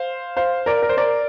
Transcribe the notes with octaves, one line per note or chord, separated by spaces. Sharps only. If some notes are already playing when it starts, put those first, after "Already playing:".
Already playing: C5 F5
C5 F5
A#4 D5
A#4
C5
A#4 D5